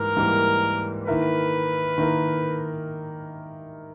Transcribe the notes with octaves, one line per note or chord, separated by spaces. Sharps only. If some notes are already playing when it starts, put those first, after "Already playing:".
Already playing: G#2 E3 G3 A#3 A#4
G#2 E3 G3 A#3
D#3 A#3 E4 A#4 B4
D#3 A#3 E4 A#4